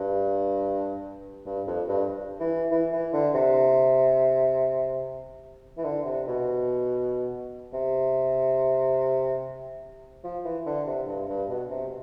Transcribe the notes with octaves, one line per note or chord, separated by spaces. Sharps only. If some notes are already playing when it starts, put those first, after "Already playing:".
Already playing: G2
G2
F2
G2
E3
E3
E3
D3
C3
E3
D3
C3
B2
C3
F3
E3
D3
C3
G2
G2
B2
C3